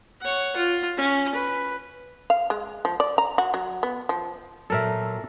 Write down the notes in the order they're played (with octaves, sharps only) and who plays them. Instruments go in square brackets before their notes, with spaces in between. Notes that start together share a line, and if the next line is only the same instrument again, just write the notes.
[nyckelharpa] C#5 F#5
F4
C#4
B4
[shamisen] F5
G#3
F3
D5
A#5
F#4
F#3
B3
F3
[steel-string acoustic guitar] A#2 F#3 [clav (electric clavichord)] A4 A#4 E5